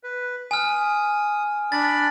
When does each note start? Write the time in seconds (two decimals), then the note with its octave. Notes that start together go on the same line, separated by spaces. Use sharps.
0.03 B4
0.51 G#5 D#6 F6
1.72 D4 D5 B5 A6